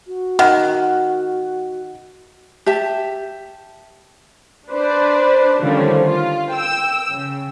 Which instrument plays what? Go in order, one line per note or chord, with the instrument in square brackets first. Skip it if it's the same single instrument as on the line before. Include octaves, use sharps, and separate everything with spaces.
[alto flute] F#4
[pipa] D#3 [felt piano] F#5
[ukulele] G4 E5 A5
[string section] D4 B4 C5 D5
D3 D#3 F3 G3 A3 C#4
F4
G5 E6
C#3